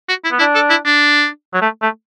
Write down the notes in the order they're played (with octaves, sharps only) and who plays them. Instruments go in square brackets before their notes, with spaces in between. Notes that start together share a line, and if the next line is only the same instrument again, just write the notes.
[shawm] F#4
E4
[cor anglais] B3
[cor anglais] D4 [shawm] E4
[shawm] A4
E4
D4
[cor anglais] F#3
A3
A3